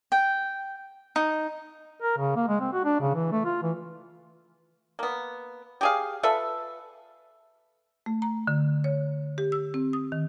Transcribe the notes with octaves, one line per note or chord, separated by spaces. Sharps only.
G5
D#4
A#4
C#3
A#3
G#3
C4
F#4
D4
C#3
E3
A3
F4
E3
A#3 B3
G4 G#4 F5
F4 A4 B4 E5
A3
A#5
D3
C#5
G4
E6
C4
D#6
D#3